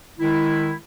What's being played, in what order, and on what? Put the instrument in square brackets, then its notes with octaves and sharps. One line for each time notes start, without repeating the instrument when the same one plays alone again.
[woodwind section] D#3 G#3 E4